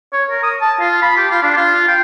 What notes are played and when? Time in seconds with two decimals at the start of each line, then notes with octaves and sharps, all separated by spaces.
0.13 C#5
0.30 A#4
0.43 D#6
0.61 A5
0.81 F4
1.02 B5
1.17 G4
1.31 F4
1.43 D4
1.56 F4
1.88 G5